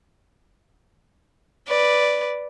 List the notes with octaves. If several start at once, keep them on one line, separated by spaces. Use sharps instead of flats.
B4 D5